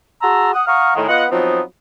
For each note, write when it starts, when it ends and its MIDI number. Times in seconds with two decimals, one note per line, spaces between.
0.22 0.51 66
0.22 0.51 68
0.22 0.51 81
0.22 0.51 82
0.22 0.51 84
0.22 0.51 88
0.54 0.63 78
0.54 0.63 87
0.66 0.92 77
0.66 0.92 78
0.66 0.92 82
0.66 0.92 85
0.66 0.92 87
0.66 0.92 89
0.96 1.07 45
0.96 1.07 51
0.96 1.07 56
1.08 1.24 59
1.08 1.24 65
1.08 1.24 75
1.08 1.24 78
1.31 1.61 53
1.31 1.61 54
1.31 1.61 59
1.31 1.61 60
1.31 1.61 63